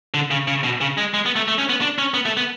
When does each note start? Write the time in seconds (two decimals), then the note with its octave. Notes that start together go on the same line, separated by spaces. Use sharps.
0.14 D3
0.31 C#3
0.48 C#3
0.64 B2
0.81 C#3
0.98 G#3
1.14 G#3
1.26 B3
1.36 A3
1.48 A3
1.59 C#4
1.69 B3
1.81 D4
1.98 C#4
2.14 B3
2.26 A3
2.37 B3